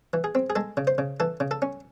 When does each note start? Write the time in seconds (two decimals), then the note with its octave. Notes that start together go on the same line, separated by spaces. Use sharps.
0.13 E3
0.24 G#4
0.35 C4
0.50 G#4
0.56 G#3 A4
0.77 C#3
0.87 C5
0.98 C#3
1.20 E3 A4
1.40 C#3
1.51 A4
1.62 C#4